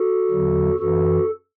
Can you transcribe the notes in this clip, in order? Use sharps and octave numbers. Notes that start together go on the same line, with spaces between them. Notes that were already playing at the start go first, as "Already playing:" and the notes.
Already playing: F#4 A4
E2 D3 F#3
F#2 E3 F#4 A4